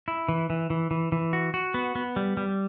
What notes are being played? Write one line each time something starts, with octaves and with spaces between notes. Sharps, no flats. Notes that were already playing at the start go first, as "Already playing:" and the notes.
E4
E3
E3
E3
E3
E3
F#4
F#4
B3
B3
G3
G3